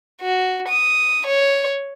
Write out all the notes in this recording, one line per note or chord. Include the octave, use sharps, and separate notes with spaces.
F#4
D#6
C#5